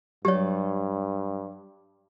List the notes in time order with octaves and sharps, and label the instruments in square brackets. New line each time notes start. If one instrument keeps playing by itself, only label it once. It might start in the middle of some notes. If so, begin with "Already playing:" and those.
[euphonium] G2 [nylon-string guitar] F#3 D5 [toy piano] G4 C#5